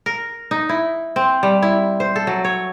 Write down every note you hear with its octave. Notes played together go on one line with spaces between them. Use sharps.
A#4
D#4
E4
C4
G3
E4
C5
A4
F#3
C#5